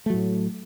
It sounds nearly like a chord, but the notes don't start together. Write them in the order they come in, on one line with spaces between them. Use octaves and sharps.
A3 F#3 A2